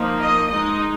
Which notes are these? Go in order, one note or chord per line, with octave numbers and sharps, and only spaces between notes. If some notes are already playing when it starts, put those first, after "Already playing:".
Already playing: F3 A#3 D#4
D#5
G#3 D#4 D#5